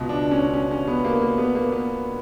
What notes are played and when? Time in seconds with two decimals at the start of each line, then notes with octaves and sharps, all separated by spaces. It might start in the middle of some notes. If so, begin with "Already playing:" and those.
Already playing: C#2 B2
0.09 D4
0.31 C#4
0.54 C#4
0.71 C#4
0.87 B3
1.05 A#3
1.22 A#3
1.38 B3
1.55 A#3
1.72 B3